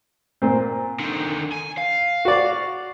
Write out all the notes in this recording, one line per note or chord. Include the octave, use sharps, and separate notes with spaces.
A#2 C4
D3 D#3
G#5
F5
F#4 D5